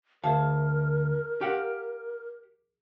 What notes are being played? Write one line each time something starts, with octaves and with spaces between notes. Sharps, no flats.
D2 G#4 A#4 E5 F5 A5
G4 F5 F#5